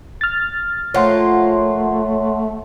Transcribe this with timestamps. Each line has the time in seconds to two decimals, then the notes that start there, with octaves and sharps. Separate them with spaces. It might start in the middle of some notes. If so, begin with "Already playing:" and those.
0.21 F6 A6
0.94 F3 A3 A#3 F4 C#5 F#5 C6